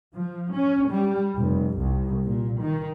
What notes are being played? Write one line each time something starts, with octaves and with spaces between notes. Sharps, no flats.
F3
C#4
G3
F1
C2
A#2
D#3